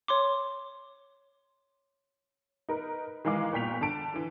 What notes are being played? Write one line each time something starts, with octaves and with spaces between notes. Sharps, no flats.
C#5 C6 D6
D#4 A#4 B4
D#3 E3 G#3 F5 D6
G1 A#2 G5 B6 F7
D3 A5 D7
D3 E3